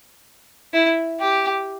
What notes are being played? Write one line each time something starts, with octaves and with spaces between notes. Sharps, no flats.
E4
G4